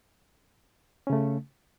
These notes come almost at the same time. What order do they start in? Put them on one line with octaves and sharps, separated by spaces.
C#4 C#3 A3